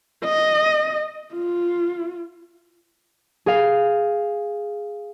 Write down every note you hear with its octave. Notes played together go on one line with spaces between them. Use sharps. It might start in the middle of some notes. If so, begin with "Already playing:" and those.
D#5
F4
G#4 F5